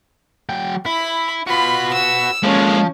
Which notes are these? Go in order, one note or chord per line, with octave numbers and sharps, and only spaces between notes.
F#3 G5
E4 B5
F4 F#4 B4 B5
E6
F3 G#3 A#3 C#4